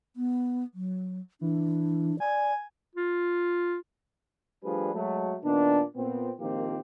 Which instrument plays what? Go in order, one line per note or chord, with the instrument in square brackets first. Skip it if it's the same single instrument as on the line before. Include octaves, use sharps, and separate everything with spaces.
[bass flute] B3
F#3
[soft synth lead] E3 [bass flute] D4
[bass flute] D5 [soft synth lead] G#5
[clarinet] F4
[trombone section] F3 G3 A3 D4 G#4 B4
F#3 G#3 A3
A#2 D#3 B3 D4
A#2 B3 C4
A#1 D#3 F3 A#3 C4 G4